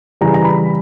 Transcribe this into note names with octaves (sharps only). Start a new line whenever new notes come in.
C#3 E3 G3 A#5
A#5
B5